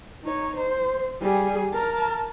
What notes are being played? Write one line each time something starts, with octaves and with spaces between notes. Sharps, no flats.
D#4 C#5
C5
G3 G#4
A#4 A5